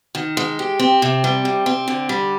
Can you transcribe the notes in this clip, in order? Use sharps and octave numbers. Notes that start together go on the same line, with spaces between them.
D#3
G#3
G4
C4
C3
G3
C3
C4
D3
G3